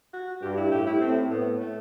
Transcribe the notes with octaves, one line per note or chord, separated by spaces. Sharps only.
F#4
G2 G4
E4
A2 G4
E4
A2 C4
A2 B3
A3